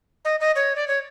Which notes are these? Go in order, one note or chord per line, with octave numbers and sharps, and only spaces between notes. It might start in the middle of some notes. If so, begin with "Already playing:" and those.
D#5
D#5
C#5
D5
C#5